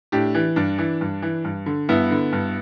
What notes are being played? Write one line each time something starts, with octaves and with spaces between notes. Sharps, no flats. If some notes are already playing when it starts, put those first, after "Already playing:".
A2 D4 G4
E3
G2 D4
E3
G2
E3
G2
D3
G2 B3 E4
D3
G2